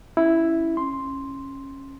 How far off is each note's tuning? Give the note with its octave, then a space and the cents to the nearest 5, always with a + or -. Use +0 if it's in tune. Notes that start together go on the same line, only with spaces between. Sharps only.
C#4 +0 E4 +0
C#4 -20 C6 +0